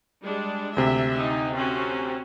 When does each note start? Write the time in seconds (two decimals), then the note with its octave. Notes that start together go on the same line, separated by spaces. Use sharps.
0.23 G3 G#3 D4
0.77 D2 C3 E5
1.16 D#4
1.55 C4 C#4 F#4